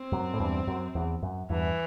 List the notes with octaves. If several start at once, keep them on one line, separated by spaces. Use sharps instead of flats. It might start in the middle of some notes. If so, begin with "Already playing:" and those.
Already playing: C4
F#2
A2
E2 G2
F#2
E2
F#2
E2 G2 E3